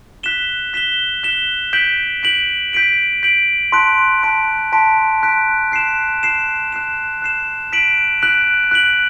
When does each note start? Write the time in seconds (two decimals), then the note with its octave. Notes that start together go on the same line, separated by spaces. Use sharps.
0.23 F#6 B6 E7 G7
0.73 F#6 B6 E7 G7
1.23 F#6 B6 E7 G7
1.73 G6 B6 D7 F#7
2.23 G6 B6 D7 F#7
2.73 G6 B6 D7 F#7
3.23 G6 B6 D7 F#7
3.72 A5 C6 F#6 B6 D7
4.23 A5 C6 F#6 B6 D7
4.73 A5 C6 F#6 B6 D7
5.22 A5 C6 F#6 B6 D7
5.72 F#6 C7 E7
6.23 F#6 C7 E7
6.73 F#6 C7 E7
7.22 F#6 C7 E7
7.73 F#6 B6 D7 F#7
8.22 F#6 B6 D7 F#7
8.71 F#6 B6 D7 F#7